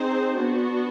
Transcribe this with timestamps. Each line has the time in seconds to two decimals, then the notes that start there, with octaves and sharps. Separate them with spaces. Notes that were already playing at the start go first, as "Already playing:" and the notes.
Already playing: C4 D#4 G#4 C5
0.35 B3 D4 F#4